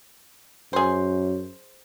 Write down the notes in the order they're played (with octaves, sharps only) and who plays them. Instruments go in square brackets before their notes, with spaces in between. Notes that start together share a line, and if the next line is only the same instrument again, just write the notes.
[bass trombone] F#2 [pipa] G#4 C5